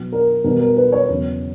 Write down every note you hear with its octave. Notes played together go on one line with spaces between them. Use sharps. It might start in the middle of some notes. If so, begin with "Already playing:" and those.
Already playing: B2 F#3
A#4
B2 G3 A#4
A#4
B4
C#5
E2 C#3 F#3